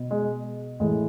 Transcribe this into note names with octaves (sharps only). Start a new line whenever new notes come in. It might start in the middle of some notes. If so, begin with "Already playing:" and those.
Already playing: B2
G#3
A2 E3 G#3